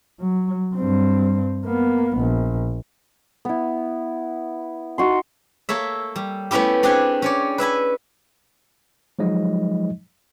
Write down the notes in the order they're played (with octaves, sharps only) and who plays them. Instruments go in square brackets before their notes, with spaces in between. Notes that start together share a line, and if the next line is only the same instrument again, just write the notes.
[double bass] F#3
G2 C4
A#3 B3
A#1
[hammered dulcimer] B3 E4
D#4 F#4 C6
[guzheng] A#3 A4 C#5 E5
G3
A3 B3 C#4 E4 G4
C4 D4 G4 G#4 F#5 G#5
C#4 C#5 D5
B4 E5 G#5 B5
[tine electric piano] F3 F#3 G#3 D#4 D#5